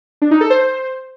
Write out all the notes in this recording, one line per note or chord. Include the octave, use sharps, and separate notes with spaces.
D4
D#4
A4
C5